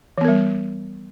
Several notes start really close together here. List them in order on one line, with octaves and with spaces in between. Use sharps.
E3 B3 A#4 G3